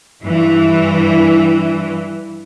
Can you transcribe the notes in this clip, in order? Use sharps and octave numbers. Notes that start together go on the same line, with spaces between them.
G2 E3